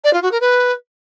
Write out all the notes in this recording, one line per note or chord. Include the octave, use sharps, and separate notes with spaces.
D5
F4
F#4
A#4
B4